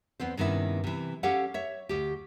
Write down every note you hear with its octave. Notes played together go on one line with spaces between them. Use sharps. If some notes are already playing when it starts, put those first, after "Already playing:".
E2 B3 C4 C5
G2 C3 D#3 B3 C#4 E4
C3 E3
C#4 G4 A4 C#5 F5 F#5
C#5 E5
D2 G4